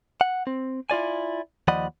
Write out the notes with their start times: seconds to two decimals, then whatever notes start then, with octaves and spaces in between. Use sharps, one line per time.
0.21 F#5
0.47 C4
0.90 E4 F4 D5 G#5
1.68 D#2 F3 D5 D#5 F#5 B5